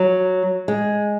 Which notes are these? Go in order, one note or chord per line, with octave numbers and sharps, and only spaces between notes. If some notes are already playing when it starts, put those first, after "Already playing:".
Already playing: F#3
G#3